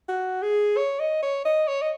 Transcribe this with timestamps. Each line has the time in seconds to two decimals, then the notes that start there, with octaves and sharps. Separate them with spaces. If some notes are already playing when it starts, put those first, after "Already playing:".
0.09 F#4
0.43 G#4
0.77 C#5
1.00 D#5
1.22 C#5
1.45 D#5
1.67 C#5
1.82 D#5